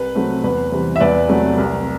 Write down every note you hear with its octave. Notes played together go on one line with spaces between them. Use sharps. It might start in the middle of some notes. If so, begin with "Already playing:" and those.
Already playing: C2 B4
C3 F#3 A3 C4
E2 B4
C3 E3 G3 C4
E5
E2 B4 D5
C3 F#3 A3
C2